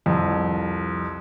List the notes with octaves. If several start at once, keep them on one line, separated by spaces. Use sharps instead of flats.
C2 F2